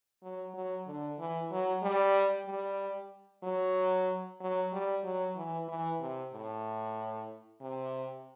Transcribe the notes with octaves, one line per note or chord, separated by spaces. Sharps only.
F#3
F#3
D3
E3
F#3
G3
G3
F#3
F#3
G3
F#3
E3
E3
C3
A2
C3